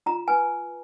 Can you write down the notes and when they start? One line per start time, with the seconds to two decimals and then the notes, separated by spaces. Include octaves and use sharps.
0.06 F4 A#5
0.28 B4 G#5